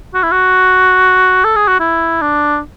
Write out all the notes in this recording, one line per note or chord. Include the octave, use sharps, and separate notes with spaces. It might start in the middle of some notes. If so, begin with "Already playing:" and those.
F#4
E4
F#4
A4
G#4
F#4
E4
D4